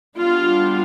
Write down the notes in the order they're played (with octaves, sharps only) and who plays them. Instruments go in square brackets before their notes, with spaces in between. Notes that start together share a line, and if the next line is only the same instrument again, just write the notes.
[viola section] G3 B3 D4 F4